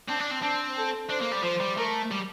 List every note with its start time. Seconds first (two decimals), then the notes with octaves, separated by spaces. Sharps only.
0.09 C4 D4
0.20 D4
0.31 C4
0.42 C4 D4
0.77 A4
1.10 D4 C5
1.22 A#3
1.32 G3
1.43 F3 C5
1.60 G3
1.78 A3 A#4
2.11 G3